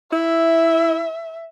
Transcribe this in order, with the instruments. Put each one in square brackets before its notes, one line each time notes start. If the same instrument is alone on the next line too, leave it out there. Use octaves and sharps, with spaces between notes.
[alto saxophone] E4 [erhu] E5